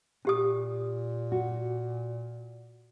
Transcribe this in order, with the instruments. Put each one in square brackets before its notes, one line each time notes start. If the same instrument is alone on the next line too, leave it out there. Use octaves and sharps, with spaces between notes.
[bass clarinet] A#2 [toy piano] C#4 G4 D#6
[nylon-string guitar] F#4